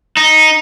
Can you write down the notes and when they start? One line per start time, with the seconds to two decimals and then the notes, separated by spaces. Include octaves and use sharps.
0.17 D#4